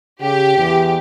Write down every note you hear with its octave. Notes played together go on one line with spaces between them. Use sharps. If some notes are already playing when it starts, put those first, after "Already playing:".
C#3 G4
E2